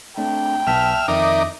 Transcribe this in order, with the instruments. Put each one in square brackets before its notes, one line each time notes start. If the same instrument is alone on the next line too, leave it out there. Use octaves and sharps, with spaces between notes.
[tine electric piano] A3 C4 D4 [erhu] G5
[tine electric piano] B1 B3 B6 [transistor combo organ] E5 F6 [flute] A5
[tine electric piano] F2 D#3 [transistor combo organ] D#4 A#4 D5 [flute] E5